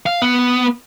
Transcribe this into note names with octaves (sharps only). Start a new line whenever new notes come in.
F5
B3